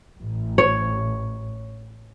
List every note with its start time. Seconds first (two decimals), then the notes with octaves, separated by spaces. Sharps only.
0.19 A1
0.58 C#5